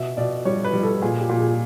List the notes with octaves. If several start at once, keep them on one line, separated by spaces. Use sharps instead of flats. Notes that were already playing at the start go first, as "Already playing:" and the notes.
Already playing: B2 E5
B2 D5
G3 C#5
B4
G3
A4
A#2 G#4
G4
A#2
G#4